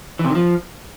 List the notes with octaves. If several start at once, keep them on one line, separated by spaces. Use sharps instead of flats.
E3
C3
D#3
F3